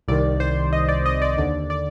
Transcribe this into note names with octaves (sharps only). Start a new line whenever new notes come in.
C2 C3 D#3 D5
C5
D#5
D5
D#5
D5
D#2 D3 D5
D5